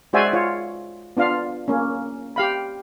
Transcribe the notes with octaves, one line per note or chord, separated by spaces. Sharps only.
G#3 F#4 C5 D5 E5 G#5
F4 C#5
B3 D4 F4 F5
A#3 C#4
G4 F5 B5